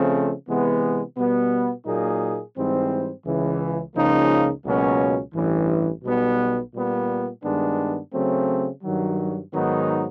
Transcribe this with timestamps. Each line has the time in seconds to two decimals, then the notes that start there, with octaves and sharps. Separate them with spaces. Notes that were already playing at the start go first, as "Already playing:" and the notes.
Already playing: C#3 F3 A3 C4
0.47 C3 E3 G#3 B3
1.16 B2 G3 B3
1.85 A#2 F#3 A#3 D#4 G#4
2.56 G#2 E3 G3 C4
3.25 C#2 C#3 E3
3.94 C#2 C#3 F3 A#3 D#4
4.65 C#2 B2 F#3 A#3 C#4
5.34 A1 G2 E3
6.04 B1 B2 G3 B3
6.74 A#2 G3 B3
7.43 G2 D#3 G#3 B3 D4
8.13 C#3 F#3 A3 C4
8.83 G2 D#3 F#3
9.53 G#2 D#3 F#3 B3 D#4